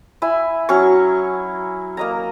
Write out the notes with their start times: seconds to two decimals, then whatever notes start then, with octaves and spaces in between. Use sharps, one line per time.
0.22 E4 G#5
0.69 F#3 C#4 C#6
1.97 A#3 D#5 A#5